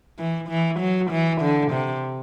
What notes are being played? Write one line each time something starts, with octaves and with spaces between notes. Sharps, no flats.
E3
E3
F#3
E3
D3
C3